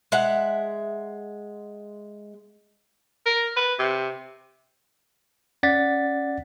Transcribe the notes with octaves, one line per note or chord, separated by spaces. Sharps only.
G#3 E5 F#5
A#4
B4
C3
C#4 D5 F#5 A6 B6